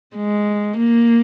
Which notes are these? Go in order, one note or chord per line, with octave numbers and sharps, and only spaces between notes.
G#3
A#3